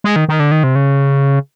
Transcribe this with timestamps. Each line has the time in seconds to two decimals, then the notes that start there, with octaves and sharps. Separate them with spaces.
0.04 G#3
0.16 D#3
0.29 D#3
0.40 D3
0.52 D#3
0.64 C3
0.75 C#3